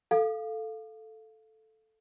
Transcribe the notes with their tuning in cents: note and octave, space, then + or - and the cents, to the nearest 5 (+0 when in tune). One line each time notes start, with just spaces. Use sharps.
A4 +0 F5 +0 D6 +45